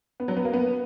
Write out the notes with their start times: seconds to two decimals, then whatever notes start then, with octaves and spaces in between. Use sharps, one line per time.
0.20 B3
0.28 F#3
0.37 B3
0.45 A#3
0.53 B3